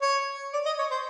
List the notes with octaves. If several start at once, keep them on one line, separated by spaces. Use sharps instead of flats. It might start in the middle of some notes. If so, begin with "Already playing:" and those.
C#5
D5
D#5
C#5
C5